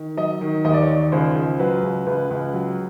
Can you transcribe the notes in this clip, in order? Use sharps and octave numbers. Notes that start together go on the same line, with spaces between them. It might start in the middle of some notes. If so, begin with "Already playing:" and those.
Already playing: D#3
F#3 D#5
D#3
D#2 D#5
D5
C#5
D#3 D5
C#2 C5
C#2
F#3 B4
C#2
C#2 B4
C#2
F#3